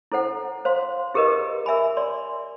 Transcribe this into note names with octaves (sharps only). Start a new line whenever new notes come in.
E4 A4 C5 F#5
C5 F5 C6
E4 G4 G#4 A#4 B4 D#5
A#4 E5 G#5 B5
D5 C6